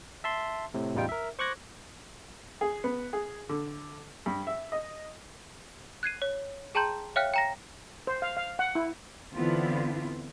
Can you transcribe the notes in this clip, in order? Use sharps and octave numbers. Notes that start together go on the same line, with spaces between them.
E5 A5 C6
A2 C3
A1 E2 G3 D#4 F4 G5
A#4 E5
C5 C#6 D6 F#6 G#6 A#6
G#4
B3
G#4
D3
G2
E5
D#5
F#6 G#6 C7 D#7
C#5
G#4 G5 A5 A#5 C6 G6
C#5 E5 F5 G5 F6 F#6
G5 A#5 A#6
C5
F5
F5
F#5
E4
D3 E3 B3 C4 E4 F4